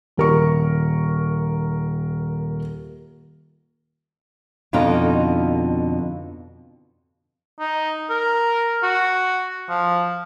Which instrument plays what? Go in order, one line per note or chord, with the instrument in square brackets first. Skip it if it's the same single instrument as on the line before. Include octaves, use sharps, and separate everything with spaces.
[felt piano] D#1 A#4 C#6
[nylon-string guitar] F2 B2 D3 D#4 F4
[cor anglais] D#4
A#4
F#4
F3